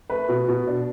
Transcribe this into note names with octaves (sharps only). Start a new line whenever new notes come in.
A3 B4
B2
B2
D4